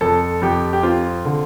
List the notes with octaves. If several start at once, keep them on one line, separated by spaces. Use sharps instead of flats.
F2 A4
F2 G4
G4
C4 F4
D3